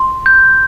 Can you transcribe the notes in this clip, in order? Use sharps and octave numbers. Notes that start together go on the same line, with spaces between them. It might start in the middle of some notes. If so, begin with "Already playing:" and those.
Already playing: C6
G6